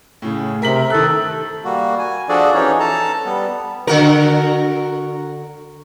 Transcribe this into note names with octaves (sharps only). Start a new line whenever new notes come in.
A2 C#3
C3 A#4 B6 F#7
D#3 A4 F#6
G3 A#3 F#4
G#5
F3 D4 F#4 G#4 A4 D5
E3 C#4 D#4 C#5
A4 A5 A#5
G3 B3
D3 F#4 A#4